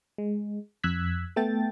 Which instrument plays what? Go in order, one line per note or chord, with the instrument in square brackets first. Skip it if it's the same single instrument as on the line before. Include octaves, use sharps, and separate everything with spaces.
[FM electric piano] G#3
F2 E6 F#6 G#6 B6
A3 B3 A4 G5 A6